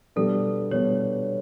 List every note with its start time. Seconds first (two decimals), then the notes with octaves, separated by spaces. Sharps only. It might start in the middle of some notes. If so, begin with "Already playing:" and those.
0.16 B2 G3 B3 D4 A4
0.71 B2 G3 B3 D4 C#5